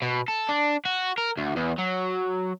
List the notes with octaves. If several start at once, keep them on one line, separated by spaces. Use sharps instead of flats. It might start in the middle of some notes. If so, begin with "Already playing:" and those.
B2
A4
D4
F#4
A#4
D2
E2
F#3